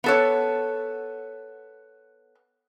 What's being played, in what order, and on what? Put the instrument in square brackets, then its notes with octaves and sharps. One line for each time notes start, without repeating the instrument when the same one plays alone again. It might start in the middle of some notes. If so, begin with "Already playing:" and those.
[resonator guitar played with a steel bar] B3 A4 C#5